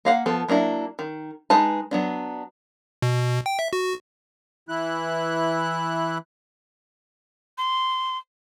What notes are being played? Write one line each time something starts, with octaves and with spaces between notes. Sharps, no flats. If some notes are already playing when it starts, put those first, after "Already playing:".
A#3 F5 F#5
F3 B3 A4
F#3 A#3 D4 E4
D#3
G#3 D#4 B4 A5
F#3 B3 D4
B2
G5
E5
F#4
E3 E4 F#6
C6